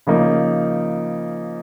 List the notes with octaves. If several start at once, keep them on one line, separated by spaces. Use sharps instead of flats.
C#3 F3 A#3 D#4